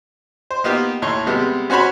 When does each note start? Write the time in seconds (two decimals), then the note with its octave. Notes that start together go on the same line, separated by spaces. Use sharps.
0.51 C5
0.64 A#3 B3 D#4 F4 G4
1.02 D#2 A2 C#5 C6
1.27 C3 G3 G#3 B3
1.70 C#4 F#4 C5 C#5 B5